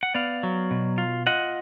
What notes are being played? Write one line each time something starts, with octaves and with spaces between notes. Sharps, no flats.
F#5
B3 D5 F5
F#3
B2
F4
F4 D#5 F#5